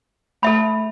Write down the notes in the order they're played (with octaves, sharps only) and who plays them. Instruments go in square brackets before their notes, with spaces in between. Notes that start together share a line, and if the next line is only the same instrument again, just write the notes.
[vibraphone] A3 [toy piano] A4 E5 B5